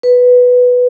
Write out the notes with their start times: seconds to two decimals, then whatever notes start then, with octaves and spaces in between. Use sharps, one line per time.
0.03 B4